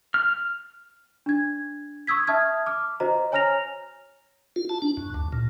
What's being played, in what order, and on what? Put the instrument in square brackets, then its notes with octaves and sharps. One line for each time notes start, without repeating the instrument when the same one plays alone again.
[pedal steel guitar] F6
[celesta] D4 G#6
C#6 D#6 E6 G#6 B6
E5 A5 D#6 F6 G#6
D6 F6
F#4 C5 D#5 A#5
C#5 G#5 A#5 F6 A#6 F7
[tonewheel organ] F4
A5
D4
F#2
D2
A#2